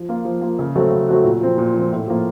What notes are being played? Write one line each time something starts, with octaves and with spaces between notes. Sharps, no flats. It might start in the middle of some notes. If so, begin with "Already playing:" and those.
Already playing: F3
A#3 F4
F3
A#3 F4
C#3
F#3 A3 C4 F#4
C#3
F#3 A3 C4 F#4
A#2
F3 C4
A#2
F3
C4
A2
F3 A#3 F4